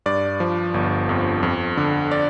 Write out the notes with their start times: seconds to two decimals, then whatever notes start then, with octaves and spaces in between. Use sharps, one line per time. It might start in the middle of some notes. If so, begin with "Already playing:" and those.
0.06 G2 D5
0.40 F3
0.74 G1
1.09 F2
1.43 F2
1.77 D3
2.11 D5